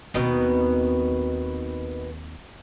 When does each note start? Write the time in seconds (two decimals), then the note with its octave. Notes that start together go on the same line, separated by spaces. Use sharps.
0.14 D#2 B2 D#3 B3 C4